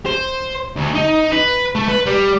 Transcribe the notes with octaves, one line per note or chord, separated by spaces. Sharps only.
C5
D2
D#4
B4
A3
B4
G3